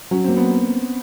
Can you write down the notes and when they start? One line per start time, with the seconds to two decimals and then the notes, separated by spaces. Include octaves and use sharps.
0.11 F#3 C#4
0.24 C4
0.28 A#3
0.37 B3